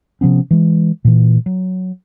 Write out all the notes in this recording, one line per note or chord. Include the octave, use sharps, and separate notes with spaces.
C3 F3 B3 C#4
E3 G#3
A#2 E3
F#3